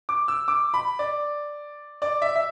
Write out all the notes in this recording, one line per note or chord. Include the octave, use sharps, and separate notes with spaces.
D6
E6
D6
B5
D5
D5
E5
E5